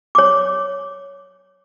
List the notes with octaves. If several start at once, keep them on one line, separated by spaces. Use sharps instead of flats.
C#5 D6